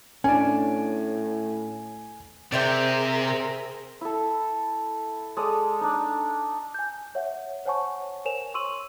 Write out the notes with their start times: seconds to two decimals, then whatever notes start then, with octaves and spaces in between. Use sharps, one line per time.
0.24 A2 C#4 D4 G#5
2.52 C3 G#4 A#4 C5 D5 E5 G5
4.01 E4 A4
5.37 G#3 A4 D5 D#6
5.81 D4 D#4
6.74 G#5 G6
7.15 C#5 E5 F#5
7.66 C5 C#5 F#5 G#5 A5 C#6
8.25 A#4 C5 C#5 G#5 E7 F7
8.54 C6 C#6 E6 D#7 F#7